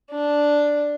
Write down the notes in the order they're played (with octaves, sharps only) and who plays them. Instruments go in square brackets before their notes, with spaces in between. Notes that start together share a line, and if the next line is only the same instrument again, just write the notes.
[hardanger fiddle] D4